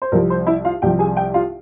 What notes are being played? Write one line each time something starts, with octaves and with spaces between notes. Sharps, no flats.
C5
C2 C3 F3 A#4
C5
E4 E5
F4 F5
C2 C3 F3 G4 G5
G#4 G#5
G4 G5
F4 F5